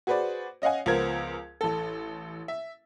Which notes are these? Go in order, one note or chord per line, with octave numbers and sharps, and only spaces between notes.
F#4 G#4 B4 C5 D5
C#4 D#5 F5 F#5 G#5
C#2 F3 B3 A#4 C5 G#6
A1 A4
E5